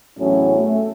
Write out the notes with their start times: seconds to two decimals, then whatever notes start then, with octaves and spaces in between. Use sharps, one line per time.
0.18 E2 A2 F#3 C#4
0.57 A3